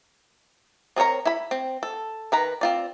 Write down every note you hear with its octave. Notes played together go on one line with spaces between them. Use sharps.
C4 G#4 A#4 C#5 A#5
E4 B5
C4
A4
D#3 B4 A#5
C4 F4 D5